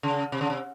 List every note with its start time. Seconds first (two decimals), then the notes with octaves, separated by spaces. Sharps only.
0.03 C#3
0.32 C3
0.41 C#3
0.50 C3